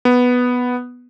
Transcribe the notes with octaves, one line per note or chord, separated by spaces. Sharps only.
B3